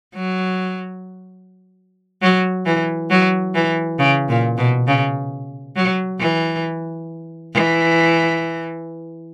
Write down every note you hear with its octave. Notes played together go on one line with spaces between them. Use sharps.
F#3
F#3
E3
F#3
E3
C#3
A#2
B2
C#3
F#3
E3
E3